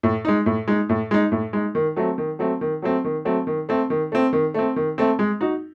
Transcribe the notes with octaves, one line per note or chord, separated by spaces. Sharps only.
A2
G#3 D#4
A2
G#3 D#4
A2
G#3 D#4
A2
G#3 D#4
D#3
F#3 A3 C4
D#3
F#3 A3 C4
D#3
F#3 A3 C4
D#3
F#3 A3 C4
D#3
A3 C4
D#3
A3 C4
D#3
A3 C4
D#3
A3 C4
G#3
D#4 F#4